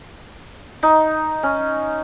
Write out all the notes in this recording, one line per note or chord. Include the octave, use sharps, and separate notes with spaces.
D#4
C#4